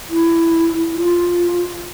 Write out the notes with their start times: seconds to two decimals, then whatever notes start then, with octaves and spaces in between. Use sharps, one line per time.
0.10 E4
0.96 F4